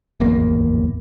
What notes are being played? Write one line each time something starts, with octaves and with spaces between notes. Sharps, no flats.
D1 G#1 E2 A#3